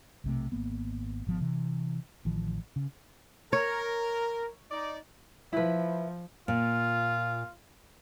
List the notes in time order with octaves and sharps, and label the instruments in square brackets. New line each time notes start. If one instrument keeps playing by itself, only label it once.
[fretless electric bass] B1 C3 A3
G#1 A#3 B3
G#1 F3 B3
C3 E3
A1 D#3 F3
C#3
[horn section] A#4 [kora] C#5
[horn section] D#4 D5
[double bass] F3 [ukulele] E4 B4
[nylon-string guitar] A#2 [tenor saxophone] F4